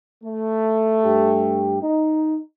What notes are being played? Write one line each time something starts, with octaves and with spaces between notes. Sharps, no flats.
A3
G2 G4
D#4